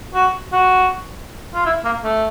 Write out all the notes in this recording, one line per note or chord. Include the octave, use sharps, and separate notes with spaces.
F#4
F#4
F4
E4
A#3
A3